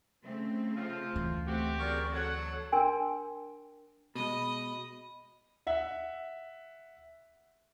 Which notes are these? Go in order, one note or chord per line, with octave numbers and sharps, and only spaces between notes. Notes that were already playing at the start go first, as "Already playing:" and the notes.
C#3 A3 C4
F3 F4
D2 E3
A3 B3 C4 F#4 G4
C4 G#4 A#4 D5 C#6
F#3 A4 C#5 F#5
D4 A#4 G5 G#5 C6
B2 G#3 D#5 B5
E5 F#5